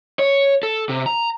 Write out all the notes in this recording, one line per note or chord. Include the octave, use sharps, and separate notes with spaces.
C#5
A4
C3
A#5